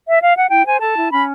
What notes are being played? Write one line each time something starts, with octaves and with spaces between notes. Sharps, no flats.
E5
F5
F#5
E4 G5
C5 G#5
A4 A5
E4
C#4 B5